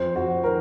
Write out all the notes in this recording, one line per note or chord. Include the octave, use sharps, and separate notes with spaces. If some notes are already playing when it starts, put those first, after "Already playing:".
Already playing: F2 C5
F2 F#4
D#3 A#4